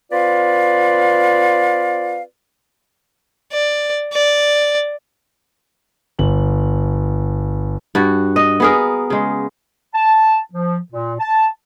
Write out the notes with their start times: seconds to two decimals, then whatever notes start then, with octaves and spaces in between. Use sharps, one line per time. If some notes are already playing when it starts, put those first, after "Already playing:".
0.12 C4 F4 B4 D5 F5
3.52 D5
4.13 D5
6.19 G1 F#7
7.95 G2 F#4
8.36 D#5
8.60 B3 G#4 A#4
9.10 C#3 G#3
9.95 A5
10.53 F3
10.93 A#2
11.20 A5